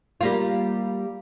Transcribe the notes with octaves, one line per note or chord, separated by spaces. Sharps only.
G3 A#3 F4